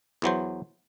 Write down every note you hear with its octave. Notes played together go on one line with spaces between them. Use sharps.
E2 E3 F#3 C5